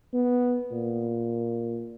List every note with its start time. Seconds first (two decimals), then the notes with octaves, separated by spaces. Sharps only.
0.13 B3
0.71 A#2